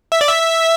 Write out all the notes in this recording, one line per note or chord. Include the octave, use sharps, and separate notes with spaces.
E5
D5
E5